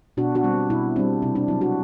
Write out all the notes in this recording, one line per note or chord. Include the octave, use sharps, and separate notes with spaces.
B2 D4 F#4
D4 F#4
G3 C4
B2 E4
G3 C4 D4
C3 E4
D4
F#3 C4 E4
D4 F#4